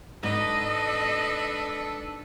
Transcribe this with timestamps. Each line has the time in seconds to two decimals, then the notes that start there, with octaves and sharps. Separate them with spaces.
0.23 G#2 D4 A4 B4 D#5